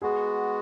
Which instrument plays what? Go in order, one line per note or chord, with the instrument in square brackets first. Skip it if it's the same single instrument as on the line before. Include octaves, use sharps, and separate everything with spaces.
[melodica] G#3 B3 F#4 [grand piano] G#4